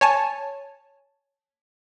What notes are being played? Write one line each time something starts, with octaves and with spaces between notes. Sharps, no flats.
C#5 G#5 A5